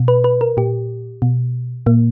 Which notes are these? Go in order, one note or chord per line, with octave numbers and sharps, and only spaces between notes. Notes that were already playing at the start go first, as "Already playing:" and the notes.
Already playing: B2
B4
B4
A#4
A#2 G4
B2
A#2 A#3